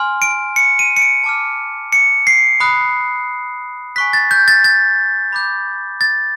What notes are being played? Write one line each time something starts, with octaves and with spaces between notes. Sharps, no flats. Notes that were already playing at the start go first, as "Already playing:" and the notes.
Already playing: G#5 C6 F6
D7
C#7
D#7
C#7
D7
A5 D6 F6
C#7
C7
B5 D#6 F#6
G#5 C#6 F#6 B6
A6
G6
A6
A6
B5 D6 G6
A6